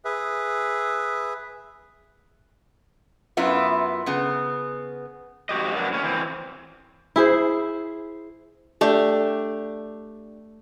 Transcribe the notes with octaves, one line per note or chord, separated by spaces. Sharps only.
G#4 B4 E5
F#2 B3 E4 F4
C#3 B3
F2 G#2 F#4 G4 D#5
F#3 A#3 B3 D4
A2 C#4
E3 C4
E4 G#4 C5
A3 D4 G4